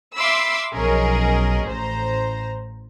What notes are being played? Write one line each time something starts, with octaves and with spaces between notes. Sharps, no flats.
E5 F5 B5 C6 D6 E6
B1 F3 C#4 G#4 A#4 D#5
A1 C5 A#5